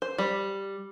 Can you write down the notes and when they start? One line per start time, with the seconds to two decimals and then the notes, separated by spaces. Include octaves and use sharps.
0.02 C5
0.18 G3